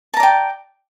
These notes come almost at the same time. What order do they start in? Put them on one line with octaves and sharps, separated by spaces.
A5 A#5 D5 G5